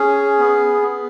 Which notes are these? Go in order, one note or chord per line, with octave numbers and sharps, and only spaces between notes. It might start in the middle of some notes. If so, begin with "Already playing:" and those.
Already playing: C#4 G#4
B3
B3